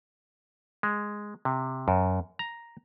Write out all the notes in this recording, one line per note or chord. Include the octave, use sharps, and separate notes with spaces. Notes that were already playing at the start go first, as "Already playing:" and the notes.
G#3
C3
F#2
A#5